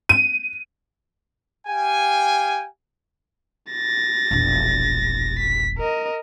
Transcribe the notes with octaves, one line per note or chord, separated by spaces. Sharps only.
D#7
G4 F5 G5 G#5
A6 A#6
E1 A#1
B6
A#4 D#5